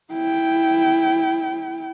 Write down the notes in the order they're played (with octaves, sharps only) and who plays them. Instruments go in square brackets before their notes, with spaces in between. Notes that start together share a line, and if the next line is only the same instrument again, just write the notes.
[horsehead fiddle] E4 G5